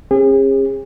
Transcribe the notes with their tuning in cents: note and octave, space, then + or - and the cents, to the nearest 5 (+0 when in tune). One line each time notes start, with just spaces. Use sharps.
C#4 -45 G#4 -40